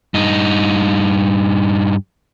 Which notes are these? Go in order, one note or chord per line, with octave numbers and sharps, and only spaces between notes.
G2 D#4